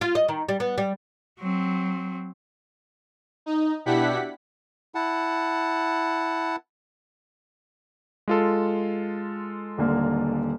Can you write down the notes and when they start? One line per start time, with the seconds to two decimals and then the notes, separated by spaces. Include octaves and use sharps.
0.01 F4
0.15 D#5
0.29 D#3
0.49 G3
0.60 B3
0.78 G3
1.39 F#3 C4
3.46 D#4
3.86 B2 D4 E4 G4 F#5 B6
4.95 E4 F#5 A5
8.28 G#3 F4 A4
9.78 D#1 D3 A#3